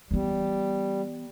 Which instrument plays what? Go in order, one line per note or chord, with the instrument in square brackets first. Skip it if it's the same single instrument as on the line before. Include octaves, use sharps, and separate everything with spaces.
[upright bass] E3 B3 [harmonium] G3